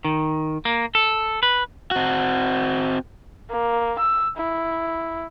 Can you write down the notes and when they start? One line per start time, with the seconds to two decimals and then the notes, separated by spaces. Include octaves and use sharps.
0.04 D#3
0.65 A#3
0.95 A4
1.43 B4
1.91 C4 F#4
3.50 A#3
3.98 E6
4.37 E4